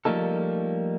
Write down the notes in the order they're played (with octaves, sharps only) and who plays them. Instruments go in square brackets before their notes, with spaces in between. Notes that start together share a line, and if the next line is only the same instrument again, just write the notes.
[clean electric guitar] F3 G3 A3 A#3 D#4 A4